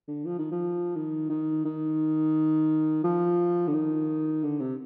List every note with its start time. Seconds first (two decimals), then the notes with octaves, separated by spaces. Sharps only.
0.08 D3
0.25 F3
0.38 D#3
0.51 F3
0.96 D#3
1.30 D#3
1.65 D#3
3.04 F3
3.68 D3
3.74 D#3
4.44 D3
4.60 C3